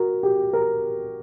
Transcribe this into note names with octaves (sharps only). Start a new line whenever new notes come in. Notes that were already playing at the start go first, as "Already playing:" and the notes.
Already playing: F#4 A#4
G4
A#4